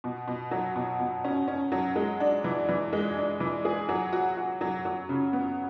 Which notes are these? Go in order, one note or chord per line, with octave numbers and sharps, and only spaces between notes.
B2
B2
F#3
B2
B2
C#4
C#4
F#3
G#3
D4
E3
E3
G#3
D4
E3
G#4
F#3
F#4
F#4
F#3
F#3
C#3
B3